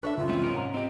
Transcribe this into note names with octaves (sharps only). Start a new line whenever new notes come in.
D4 A4 B4 C#5 E5 C#6 F#6
C#2 F#2 F4
E3 G#3 B3 C4 E5
C3 G#3 B3 C#4 A#4
G#2 A#5 C6
C4 G4 D#5